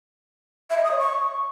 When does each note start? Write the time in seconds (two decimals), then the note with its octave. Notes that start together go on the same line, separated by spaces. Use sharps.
0.70 E5
0.77 D#5
0.84 D#6
0.91 C#5
0.98 C#6